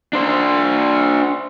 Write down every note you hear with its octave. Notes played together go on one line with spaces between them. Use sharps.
D4 C5